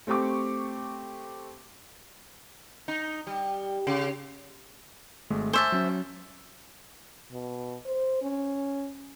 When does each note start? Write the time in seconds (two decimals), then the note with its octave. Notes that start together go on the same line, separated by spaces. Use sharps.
0.07 A3 C4 G4 C#6 D6
2.88 D#4
3.27 G3
3.87 C#3
5.30 G#1 G#3 A3
5.53 C5 E5 G#5 A5 C#6 D6
5.72 F#3 C#4
7.32 B2
7.86 C5
8.22 C#4